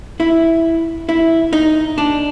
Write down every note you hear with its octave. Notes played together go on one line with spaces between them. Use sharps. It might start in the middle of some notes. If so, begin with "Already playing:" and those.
E4
E4
D#4
D4